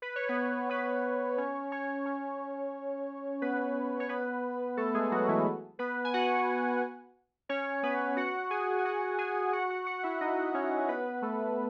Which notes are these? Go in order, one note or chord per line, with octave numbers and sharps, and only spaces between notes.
B4
C#5
B3 B4
B3 B4
C#4 C#5
C#4 C#5
C#4 C#5
B3 B4
C#5
B3 B4
A3 A4
G#3 G#4
F#3 F#4
E3 E4
B3 B4
G#5
F#4 F#5
C#4 C#5
B3 B4
F#4 F#5
G#4 G#5
G#5
F#4 F#5
G#4 G#5
F#4 F#5
F#4 F#5
F#4 F#5
E4 E5
D#4 D#5
C#4 C#5
B3 B4
A3 A4